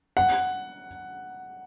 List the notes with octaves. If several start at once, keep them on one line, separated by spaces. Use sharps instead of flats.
F#5